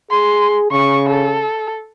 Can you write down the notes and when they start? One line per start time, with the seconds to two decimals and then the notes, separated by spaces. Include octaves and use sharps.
0.11 G#4 C6
0.72 C#3 C#6
1.09 A4